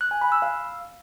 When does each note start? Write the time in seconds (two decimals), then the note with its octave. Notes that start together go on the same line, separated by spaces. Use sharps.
0.01 F#6
0.11 G#5
0.21 B5
0.32 E6
0.42 F5